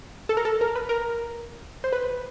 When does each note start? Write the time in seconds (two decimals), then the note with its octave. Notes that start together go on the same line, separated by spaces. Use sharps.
0.29 A4
0.37 A#4
0.45 A4
0.61 A#4
0.75 B4
0.89 A#4
1.84 C5
1.92 B4